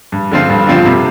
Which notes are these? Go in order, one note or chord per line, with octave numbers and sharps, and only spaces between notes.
G2
D3 F3 C4 F4
G2
D3 F3 C4 F4
C3